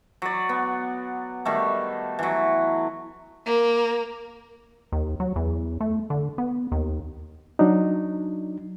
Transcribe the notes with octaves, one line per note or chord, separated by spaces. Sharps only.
F#3 D5
B3
D#3 G3 A3
E3 F#3
A#3
D#2
F#3
E2
A3
D3
B3
D#2
F#3 D4 D#4